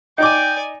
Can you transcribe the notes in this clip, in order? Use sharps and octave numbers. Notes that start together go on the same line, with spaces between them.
D#4 D5 G5 G#5 D6